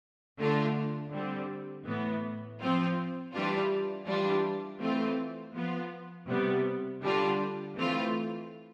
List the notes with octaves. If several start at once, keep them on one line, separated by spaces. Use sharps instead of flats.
D3 A3 D4 F4
D3 G3 C4
A2 E3 B3
F3 C4 F4
E3 G3 D4 F4
E3 G3 D4 F4
E3 A3 C4 F4
F3 B3 F4
C3 G3 B3
D3 G3 D4 F4
E3 A3 C4 F4